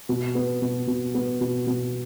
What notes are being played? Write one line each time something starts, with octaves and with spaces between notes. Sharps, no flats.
B2
B3
B2
B2
B3
B2
B2